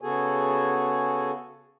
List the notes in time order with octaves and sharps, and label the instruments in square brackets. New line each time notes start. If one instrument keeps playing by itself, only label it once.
[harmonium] C#3 B3 F#4 G#4 A4 G#5